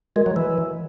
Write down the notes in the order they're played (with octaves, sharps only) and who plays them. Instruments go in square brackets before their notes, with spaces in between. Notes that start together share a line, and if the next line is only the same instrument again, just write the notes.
[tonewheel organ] G#3 [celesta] F#4 A#4 D#5
[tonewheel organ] F#3
E3